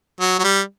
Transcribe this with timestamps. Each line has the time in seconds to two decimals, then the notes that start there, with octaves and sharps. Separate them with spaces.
0.20 F#3
0.39 F#3
0.44 G3